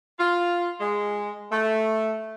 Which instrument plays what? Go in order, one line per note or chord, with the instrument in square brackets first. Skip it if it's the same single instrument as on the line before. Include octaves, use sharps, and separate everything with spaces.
[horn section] F4
G#3
A3